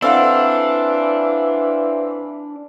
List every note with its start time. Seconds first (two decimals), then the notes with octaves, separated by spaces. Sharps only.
0.02 E3 C4 D4 A4 F5 F#5